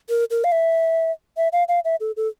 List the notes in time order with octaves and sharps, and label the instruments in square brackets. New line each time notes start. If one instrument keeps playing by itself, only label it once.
[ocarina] A#4
A#4
F5
E5
E5
F5
F5
E5
A4
A4